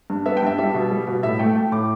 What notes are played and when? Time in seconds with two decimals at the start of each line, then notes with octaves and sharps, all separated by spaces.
0.10 G2
0.26 B3 E5
0.37 G5
0.42 G2 E5
0.58 G3 E5
0.74 B2
0.92 G3
1.07 B2
1.23 A2 E5
1.39 A3 G5
1.56 A3 G5
1.72 A2 D6